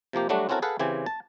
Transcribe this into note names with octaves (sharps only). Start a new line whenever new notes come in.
C3 F3 A#3 G4
F#3 G3 A3 D4 F#4
C4 C#4 E4 F#4 A4 A#4
G#4 A4 B4 F5 F#5
C#3 E3 C4 G4 G#5
A5